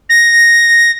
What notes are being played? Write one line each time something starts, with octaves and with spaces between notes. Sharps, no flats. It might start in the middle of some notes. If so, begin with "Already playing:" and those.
A#6